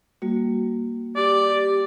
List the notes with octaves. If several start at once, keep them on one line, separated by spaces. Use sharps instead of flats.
G3 A#3 F#4
G4 D5